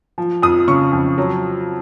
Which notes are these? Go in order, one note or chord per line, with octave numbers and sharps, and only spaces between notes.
F3
F2 D#6
C#3 C#6
F2
F#3